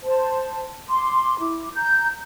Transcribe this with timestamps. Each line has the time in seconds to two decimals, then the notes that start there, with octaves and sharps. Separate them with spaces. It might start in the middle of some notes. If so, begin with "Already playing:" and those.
0.04 C5 A5
0.89 C6 D6
1.39 E4 D6
1.74 A#5 G6